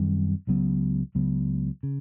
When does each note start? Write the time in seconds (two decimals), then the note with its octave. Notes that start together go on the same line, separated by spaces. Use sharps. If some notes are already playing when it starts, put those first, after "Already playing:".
Already playing: F#2 D#3 G3 C4
0.47 C#2 C#3 F#3 B3
1.15 C#2 C#3 F#3 B3
1.83 C#3